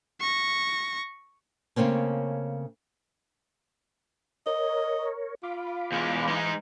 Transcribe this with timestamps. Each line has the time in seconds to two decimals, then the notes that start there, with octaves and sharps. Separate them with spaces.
0.21 C#6 A#6
1.76 C#3 A3 A#3 C4 C#4
4.46 A#4 C#5 D#5
5.43 F4 F5 B5 D6
5.92 E2 G#3
6.28 E3 G#3 D#4